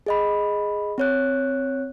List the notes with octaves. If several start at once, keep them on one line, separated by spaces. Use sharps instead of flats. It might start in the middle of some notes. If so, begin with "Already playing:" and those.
G#4 D#5 B5
C4 C#5 F#6